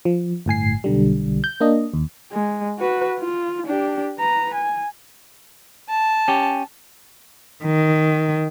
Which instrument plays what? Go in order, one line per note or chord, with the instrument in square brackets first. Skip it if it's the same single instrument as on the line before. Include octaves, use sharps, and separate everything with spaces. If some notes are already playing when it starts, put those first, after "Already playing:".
[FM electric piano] F3
G1 A2 G#5 C7
B1 D3 G3
G6
A#3 D4 D#5
D#2
[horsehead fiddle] G#3
F#4 B4
F4
D4 G4
B4 A#5
G#5
[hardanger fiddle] A5
[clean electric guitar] C#4 G4
[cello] D#3